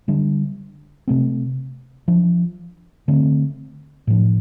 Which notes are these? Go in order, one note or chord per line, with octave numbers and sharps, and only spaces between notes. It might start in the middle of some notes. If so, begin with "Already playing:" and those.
D3 G3 D4
C3 A3 C4
F3 D4
D3 A3 C4
A2 F3 D4